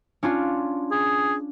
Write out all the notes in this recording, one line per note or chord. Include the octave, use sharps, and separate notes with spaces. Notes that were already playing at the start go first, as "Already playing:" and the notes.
C#4 D4 F4
G#4